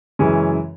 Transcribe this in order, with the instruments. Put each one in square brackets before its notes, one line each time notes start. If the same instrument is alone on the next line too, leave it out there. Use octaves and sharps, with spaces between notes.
[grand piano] F#2 C#3 E3 G#3 C#4